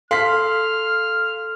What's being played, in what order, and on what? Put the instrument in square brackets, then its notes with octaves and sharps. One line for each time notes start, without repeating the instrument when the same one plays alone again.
[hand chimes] A4 C6 C7 [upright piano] F5 B6 [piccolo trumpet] F6